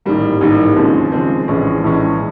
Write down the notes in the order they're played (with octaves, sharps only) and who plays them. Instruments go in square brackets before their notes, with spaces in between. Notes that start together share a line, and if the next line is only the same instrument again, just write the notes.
[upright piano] A1 G#2 D#3 G3 A#3
A1 G#2 D#3 G3 A#3
D#2 C#3 F3 G#3 C4
D#2 C#3 F3 G#3 C4
A#1 A2 E3 G#3 C#4
A#1 A2 E3 G#3 C#4